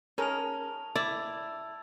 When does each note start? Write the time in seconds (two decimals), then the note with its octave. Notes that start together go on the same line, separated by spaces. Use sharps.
0.18 C#4 G#4 A#4 A5 F7
0.96 E4 D5 E6 E7